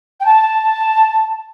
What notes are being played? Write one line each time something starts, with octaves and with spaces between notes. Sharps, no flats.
G5
A5